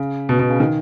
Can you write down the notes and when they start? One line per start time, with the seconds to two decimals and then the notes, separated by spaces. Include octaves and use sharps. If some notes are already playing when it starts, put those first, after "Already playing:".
Already playing: C#3
0.29 B2
0.39 B2
0.50 C#3
0.60 D#3